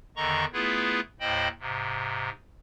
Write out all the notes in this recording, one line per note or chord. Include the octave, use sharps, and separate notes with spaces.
E2 D3 D#3 D#5 A#5 C#6
A3 B3 E4 F4 G#4 B4
D#2 A2 C5 D#5 G5 B5
G#2 C3